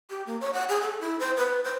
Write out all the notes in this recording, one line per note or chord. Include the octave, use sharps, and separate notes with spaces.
G4
A#3
C#5
F#5
G#4
A4
E4
C5
B4
C5